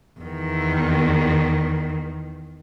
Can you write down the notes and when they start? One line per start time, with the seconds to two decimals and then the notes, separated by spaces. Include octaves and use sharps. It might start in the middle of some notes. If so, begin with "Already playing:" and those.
0.21 E2 D#3